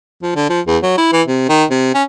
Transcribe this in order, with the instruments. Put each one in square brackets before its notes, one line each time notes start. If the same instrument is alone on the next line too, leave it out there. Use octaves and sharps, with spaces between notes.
[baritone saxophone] F3
D3
F3
E2
F#3
E4
E3
C3
D#3
C3
C#4